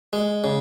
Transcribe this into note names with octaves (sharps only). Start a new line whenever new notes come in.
G#3
C#3